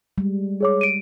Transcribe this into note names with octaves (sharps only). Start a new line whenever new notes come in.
G3 G#3
G#4 C#5 D6
D7 D#7